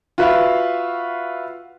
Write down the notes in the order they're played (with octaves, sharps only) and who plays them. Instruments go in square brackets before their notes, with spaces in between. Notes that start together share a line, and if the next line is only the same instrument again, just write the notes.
[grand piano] F4 F#4 B4 E5 F5